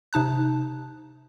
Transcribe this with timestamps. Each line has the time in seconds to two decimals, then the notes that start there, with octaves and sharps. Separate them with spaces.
0.13 C3 D#4 A5 F#6